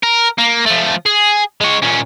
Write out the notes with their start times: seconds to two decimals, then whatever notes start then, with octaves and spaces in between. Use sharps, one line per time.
0.03 A#4
0.38 A#3
0.66 F3 A3
1.06 G#4
1.61 G#3 C#5
1.83 A#2 C#4